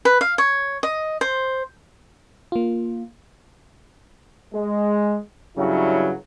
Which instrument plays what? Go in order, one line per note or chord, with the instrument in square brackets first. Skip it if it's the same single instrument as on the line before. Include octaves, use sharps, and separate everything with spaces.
[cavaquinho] B4
F5
C#5
D#5
C5
[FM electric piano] A#3 F4
[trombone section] G#3
G2 C#3 F#3 E4